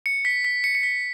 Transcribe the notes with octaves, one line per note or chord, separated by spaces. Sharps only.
C#7
B6
B6
C#7
C#7
B6